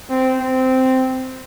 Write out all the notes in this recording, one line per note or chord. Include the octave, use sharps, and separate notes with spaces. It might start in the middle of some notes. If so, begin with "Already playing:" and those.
C4
C4